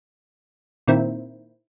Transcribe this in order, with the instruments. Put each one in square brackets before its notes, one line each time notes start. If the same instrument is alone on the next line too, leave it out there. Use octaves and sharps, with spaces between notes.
[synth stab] A#2 D#3 C4 E4